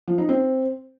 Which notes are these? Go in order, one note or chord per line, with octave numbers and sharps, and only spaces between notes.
F3
D#4
C4